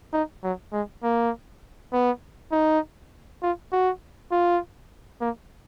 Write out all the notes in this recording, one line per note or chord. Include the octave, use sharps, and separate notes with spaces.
D#4
F#3
G#3
A#3
B3
D#4
F4
F#4
F4
A#3